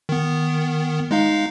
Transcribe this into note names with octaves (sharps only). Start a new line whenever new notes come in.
D#3 B3
G#3 D#4 F5